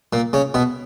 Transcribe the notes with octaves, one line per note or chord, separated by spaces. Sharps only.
A#2 A#3
C#3 C#4
B2 B3